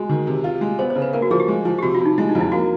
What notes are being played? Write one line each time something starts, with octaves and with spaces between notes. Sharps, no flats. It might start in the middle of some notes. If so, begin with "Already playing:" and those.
Already playing: G#3 F#4
D#3
C3
F4
G#3
B3 C5
C5
C#3
B4
A#3 A#4
F#4
F3 G#4
G4
G#3
F3
G4
C3 F#4
F4
C3
D#4
G#3 E4
D#4
F2
E4
A#3 F#4